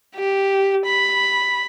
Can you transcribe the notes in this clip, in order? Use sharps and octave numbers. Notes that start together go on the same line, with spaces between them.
G4
B5